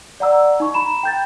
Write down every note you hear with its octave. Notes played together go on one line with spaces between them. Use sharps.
D5 F#5 A#5 E6
D#4 C#6
A#5 B5 E7
G5 G6 A6